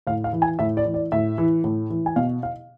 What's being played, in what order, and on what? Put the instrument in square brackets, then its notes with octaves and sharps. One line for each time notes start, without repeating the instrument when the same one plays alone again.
[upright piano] A2 F5
F5
E3
G#5
A2 E5
D5
E3
D5
A2 E5
E3
A2
E3
G#5
B2 F5
F5